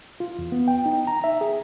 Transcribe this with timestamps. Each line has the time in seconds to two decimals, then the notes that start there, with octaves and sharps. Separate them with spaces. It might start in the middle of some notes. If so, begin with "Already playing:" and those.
0.20 F4
0.39 E2
0.52 B3
0.68 G5
0.86 D#4
1.07 A#5
1.24 E5
1.41 G#4